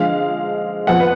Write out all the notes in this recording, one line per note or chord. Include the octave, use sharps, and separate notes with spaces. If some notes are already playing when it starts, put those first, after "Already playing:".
Already playing: D3 F3 G#3 F5
F2 F3 B3 F#5
B4